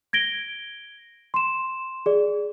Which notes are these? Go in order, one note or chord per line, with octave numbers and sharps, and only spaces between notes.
G#6 A#6 D7 G7
C6 E7
G#4 D5